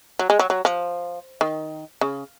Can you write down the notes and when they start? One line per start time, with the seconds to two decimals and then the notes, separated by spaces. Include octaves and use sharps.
0.19 F#3
0.30 G#3
0.39 F#3
0.50 F#3
0.65 F3
1.41 D#3
2.01 C#3